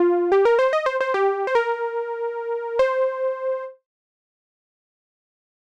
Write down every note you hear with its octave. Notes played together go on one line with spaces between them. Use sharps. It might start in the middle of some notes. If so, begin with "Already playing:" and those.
Already playing: F4
G4
A#4
C5
D#5
C5
C5
G4
C5
A#4
C5